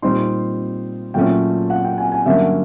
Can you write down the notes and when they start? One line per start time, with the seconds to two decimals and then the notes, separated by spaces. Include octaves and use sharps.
0.02 A#2 G3 C4 D#4 C6
1.14 A#2 F#3 A3 C#4 G5
1.70 F#5
1.85 G5
1.98 G#5
2.12 G#5
2.26 G2 D3 F#3 A#3 C#4 E5